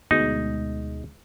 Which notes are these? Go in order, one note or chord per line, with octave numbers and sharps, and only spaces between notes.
D2 B2 G#3 D#4